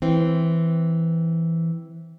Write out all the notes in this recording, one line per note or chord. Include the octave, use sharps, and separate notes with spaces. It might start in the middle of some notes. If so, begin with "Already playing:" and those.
E3 C4